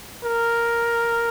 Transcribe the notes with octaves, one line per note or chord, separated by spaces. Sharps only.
A#4